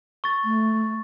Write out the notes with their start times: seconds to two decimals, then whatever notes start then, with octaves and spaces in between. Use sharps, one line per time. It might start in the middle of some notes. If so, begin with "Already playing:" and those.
0.24 C#6 A6
0.44 A3